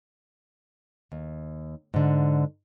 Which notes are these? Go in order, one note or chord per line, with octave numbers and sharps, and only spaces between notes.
D#2
G#2 D3